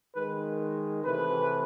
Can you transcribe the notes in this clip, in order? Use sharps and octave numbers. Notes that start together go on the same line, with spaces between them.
D#3 G#3 B4
C3 E3 A3 B4